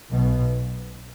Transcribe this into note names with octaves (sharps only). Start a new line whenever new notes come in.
B1 B2